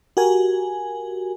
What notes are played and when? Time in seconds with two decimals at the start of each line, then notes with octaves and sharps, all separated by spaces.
0.17 F#4 G4 A#4 G#5